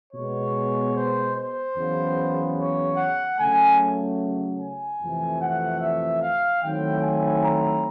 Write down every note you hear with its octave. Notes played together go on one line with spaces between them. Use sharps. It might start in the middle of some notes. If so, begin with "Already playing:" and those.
B2 G#3 B3 C#5
C5
C5
E2 C#3 F#3 B3
C#5
F#5
C#3 F#3 A3 G#5
G#5
F2 C3 E3 A3
F#5
E5
F5
D#3 F#3 A3 C4 E4 G5
G#5
A#5